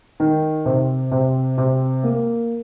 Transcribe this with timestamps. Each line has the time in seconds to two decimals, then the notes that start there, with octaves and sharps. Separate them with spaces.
0.20 D#3
0.65 C3
1.11 C3
1.58 C3
2.04 A#3